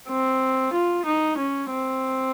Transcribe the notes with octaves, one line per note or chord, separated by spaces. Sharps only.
C4
F4
D#4
C#4
C4